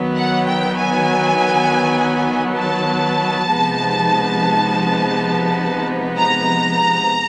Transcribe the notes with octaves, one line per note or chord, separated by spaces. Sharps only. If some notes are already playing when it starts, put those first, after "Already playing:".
Already playing: D#3 F#3 B3
F#5
G5
G#5
A5
C3 F3 G#3 B3 D#4
A#5